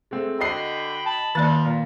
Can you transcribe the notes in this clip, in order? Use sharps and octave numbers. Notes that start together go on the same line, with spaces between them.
G#3 A3 C4
D3 F#4 D#5 G5 B5 C7
A5 B5
D#3 F3 A#3 D5 A6
A#2